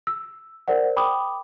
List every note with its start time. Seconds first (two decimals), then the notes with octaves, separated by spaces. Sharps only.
0.07 E6
0.68 A#4 C5 D5 F#5
0.96 G5 B5 D6 D#6